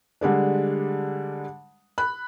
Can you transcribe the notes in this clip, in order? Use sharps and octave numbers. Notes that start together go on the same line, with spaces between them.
D3 G3 G#3 D4
B5 F#6